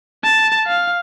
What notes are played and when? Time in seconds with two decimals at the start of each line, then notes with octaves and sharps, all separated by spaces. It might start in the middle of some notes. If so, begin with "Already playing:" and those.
0.24 A5
0.66 F5